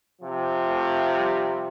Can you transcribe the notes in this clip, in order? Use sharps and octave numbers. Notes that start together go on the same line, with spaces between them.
C3 F3
A3
G3